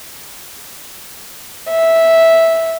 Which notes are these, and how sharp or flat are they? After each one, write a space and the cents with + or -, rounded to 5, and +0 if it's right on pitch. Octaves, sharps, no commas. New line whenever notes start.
E5 -5